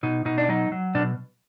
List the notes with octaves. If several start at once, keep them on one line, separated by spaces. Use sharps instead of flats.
B2 D#4
B2 D#4
D4
F#3 D#4
F#3
B2 D4